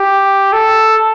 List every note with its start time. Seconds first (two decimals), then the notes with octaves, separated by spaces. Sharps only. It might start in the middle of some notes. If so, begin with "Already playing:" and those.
Already playing: G4
0.53 A4